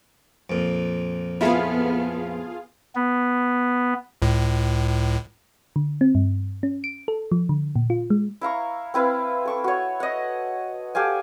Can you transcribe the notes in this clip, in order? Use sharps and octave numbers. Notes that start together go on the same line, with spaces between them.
F2 A#2
B3 E4 F4 G#4 A4 F5 B5
B3
C#2 A2
D3
C4
G2
C#4
D7
A4
F3
D3
A#2
F4
G#3
E4 F5 A#5 C#6
C4 E4 B4 F5
A4 C#6 D6
F#4 C#5
D#5 F#5
G4 A4 F5 G#5